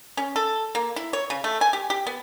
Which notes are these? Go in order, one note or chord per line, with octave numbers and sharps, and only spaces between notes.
C#4
A4
A#3
E4
C#5
C#3
A3
G#5
G4
G4
B3